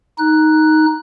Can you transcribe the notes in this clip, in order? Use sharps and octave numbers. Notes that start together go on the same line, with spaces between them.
D#4 F#6